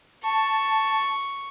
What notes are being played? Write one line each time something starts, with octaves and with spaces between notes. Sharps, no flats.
A5 C#6